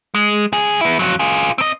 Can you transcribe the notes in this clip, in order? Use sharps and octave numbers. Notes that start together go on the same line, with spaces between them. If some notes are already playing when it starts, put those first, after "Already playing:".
G#3
C#2 G#4
B3 E4
F2 F#3
F4 G#4
C4 D#5